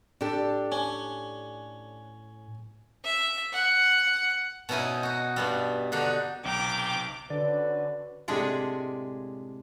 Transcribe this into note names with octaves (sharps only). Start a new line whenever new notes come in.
A2 D4 G4 A4
C#4
E5
F#5
B2 C#4 D#4 E4 G#5
D#4 F#4
G2 B2 G3
D3 D4 D#4 F#4
B1 C3 G5 A#5 D6
D3 C#4 F#4 B4 D5
A2 C3 G#3 D4 G#4 D5